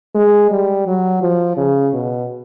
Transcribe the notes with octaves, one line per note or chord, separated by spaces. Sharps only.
G#3
G3
F#3
F3
C#3
B2